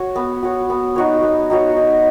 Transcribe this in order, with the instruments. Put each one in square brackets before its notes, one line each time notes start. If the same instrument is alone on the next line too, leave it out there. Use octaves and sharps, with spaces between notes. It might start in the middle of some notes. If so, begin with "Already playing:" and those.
Already playing: [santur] F#4 C#5
B3
F#4 C#5
B3
D#4 F#4 C#5
B3
D#4 F#4 C#5
D#4